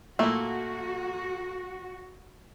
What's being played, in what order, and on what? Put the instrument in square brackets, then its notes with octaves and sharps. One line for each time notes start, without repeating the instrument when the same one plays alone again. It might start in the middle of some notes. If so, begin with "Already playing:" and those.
[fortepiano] A#2 A#3 [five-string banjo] A3 E4 [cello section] F#4